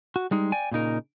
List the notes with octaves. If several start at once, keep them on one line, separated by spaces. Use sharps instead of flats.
F#4
G3 G#3 D#4
D5 G5 G#5
A#2 C#3 D#4 A#4